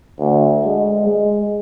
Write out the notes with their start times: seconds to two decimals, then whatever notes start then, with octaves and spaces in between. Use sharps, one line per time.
0.19 D2
0.65 G#3
1.06 G#3